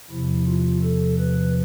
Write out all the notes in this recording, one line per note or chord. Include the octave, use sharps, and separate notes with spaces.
E2 C3 F3 E4
F4
A4
B4